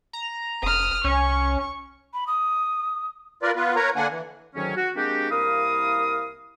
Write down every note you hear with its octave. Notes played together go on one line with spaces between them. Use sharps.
A#5
F1 D#6 F6
C2 C#4 C#6
B5
D#6
F4 A#4 B4 D5
B3 F4 B4
A#4 B4 C#5 A#5
D3 A#3 D4 F#5 G#5
E3
D2 G#2 D#3 F#3 C#4
F#4
G#3 A#3 C4 D4 F#4 G4
C2 A#3 E4 A#4 F5 D#6